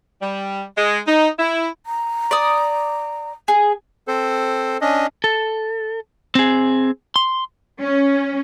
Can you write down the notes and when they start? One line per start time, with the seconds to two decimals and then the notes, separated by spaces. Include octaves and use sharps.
0.22 G3
0.77 G#3
1.08 D#4
1.39 E4
1.86 A#5
2.31 D5 D#6
3.48 G#4
4.08 C4 A4 C5
4.81 C#4 D4 D#5
5.24 A4
6.35 C4 G#4
7.16 C6
7.80 C#4